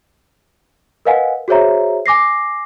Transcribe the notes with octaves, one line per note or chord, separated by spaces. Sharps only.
A#4 B4 D#5 F5 F#5 G#5
F#4 G#4 C5 C#5 E5 A#5
G#5 D6 A#6 C7